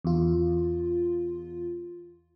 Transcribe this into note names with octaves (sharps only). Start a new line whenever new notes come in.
E2 F4